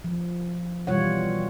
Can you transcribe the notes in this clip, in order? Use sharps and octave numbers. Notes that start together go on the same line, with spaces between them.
F3
B2 E3 G3 F4 C#5 F#5